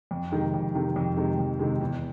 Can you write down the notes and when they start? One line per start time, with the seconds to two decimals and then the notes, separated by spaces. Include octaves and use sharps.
0.11 F2
0.32 C3 D#3 G#3
0.54 F2
0.75 C3 D#3 G#3
0.96 F2
1.17 C3 D#3 G#3
1.39 F2
1.59 C3 D#3 G#3
1.81 E2